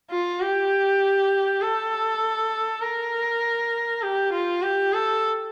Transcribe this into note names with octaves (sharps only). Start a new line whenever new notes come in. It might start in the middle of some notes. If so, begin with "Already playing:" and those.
F4
G4
A4
A#4
G4
F4
G4
A4